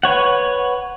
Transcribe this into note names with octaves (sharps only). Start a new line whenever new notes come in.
B4 C#5 F#5